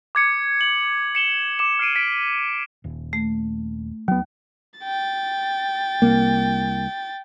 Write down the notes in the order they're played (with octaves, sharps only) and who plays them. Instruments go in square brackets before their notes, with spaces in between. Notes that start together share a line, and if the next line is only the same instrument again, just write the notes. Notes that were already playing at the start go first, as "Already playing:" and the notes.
[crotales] D6 G#6 C#7
F#7
C#7 E7 G7
D6 E7
F6 C7 D7 D#7
B6 D7
[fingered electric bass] D#1
[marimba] A3
[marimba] D#2 [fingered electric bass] F#3 B3
[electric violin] G5 A6
[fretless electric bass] C2 A#3